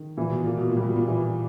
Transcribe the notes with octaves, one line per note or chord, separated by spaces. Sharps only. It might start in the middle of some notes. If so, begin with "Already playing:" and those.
Already playing: D#3
A#2 E3
B2
A#2 A#3
B2
A#2
G3
B2
A#2
E3